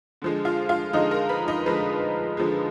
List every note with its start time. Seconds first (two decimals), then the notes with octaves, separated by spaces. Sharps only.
0.22 D3 F3 G#3
0.45 F4 F5
0.69 F4 F5
0.93 D3 F3 G#3 D#4 D#5
1.11 A#4 A#5
1.29 B4 B5
1.48 D#4 D#5
1.66 D3 F3 G#3 B4
2.37 D3 F3 G#3